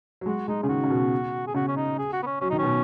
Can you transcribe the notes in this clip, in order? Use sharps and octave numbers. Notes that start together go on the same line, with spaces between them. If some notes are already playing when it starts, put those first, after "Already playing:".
F#3
G#3 F#4
G#3 D#4
C#3 G#4
D#3 F#4
C#3
B2
G#4
C#3 F#4
C#4
D#4
G#4
F#4
B3
C#4
F#3 C#4
D#3 D#4
B2 C#4